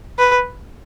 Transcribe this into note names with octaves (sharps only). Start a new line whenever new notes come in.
B4